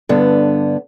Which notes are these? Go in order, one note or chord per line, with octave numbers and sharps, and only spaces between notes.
G2 D3 B3